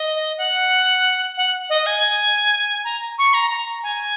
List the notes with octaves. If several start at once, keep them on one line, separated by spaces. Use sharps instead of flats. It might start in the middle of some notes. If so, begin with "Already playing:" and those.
Already playing: D#5
F#5
F#5
D#5
G#5
A#5
C#6
A#5
A#5
G#5